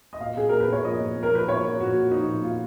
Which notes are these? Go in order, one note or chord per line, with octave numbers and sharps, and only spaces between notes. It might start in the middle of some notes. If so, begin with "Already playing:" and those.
D#5
A#2 F5
A#2 G#4
A#2 A#4
B4
A#2 C#5
F3 D#5
A#2
A#2
A#4
F3 B4
A#2 C#5
F3
A#2 F#4
F3
F3 D#4
A#2
A#2 F4